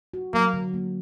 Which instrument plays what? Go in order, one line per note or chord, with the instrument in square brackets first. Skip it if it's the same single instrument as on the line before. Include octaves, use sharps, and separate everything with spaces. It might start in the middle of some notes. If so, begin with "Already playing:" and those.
[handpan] F#4
[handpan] F#3 [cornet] A#3
[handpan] D3
A#3